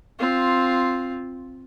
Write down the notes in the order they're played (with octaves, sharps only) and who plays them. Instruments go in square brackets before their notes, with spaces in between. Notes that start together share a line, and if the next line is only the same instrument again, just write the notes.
[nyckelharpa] C4 F4